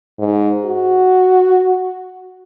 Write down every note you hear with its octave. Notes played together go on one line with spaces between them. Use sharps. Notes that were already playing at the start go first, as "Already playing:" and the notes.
G#2
F#4